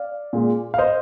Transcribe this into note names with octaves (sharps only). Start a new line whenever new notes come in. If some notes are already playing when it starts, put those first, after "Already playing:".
Already playing: D5 F5
A#2 G#3
F5
C5 D#5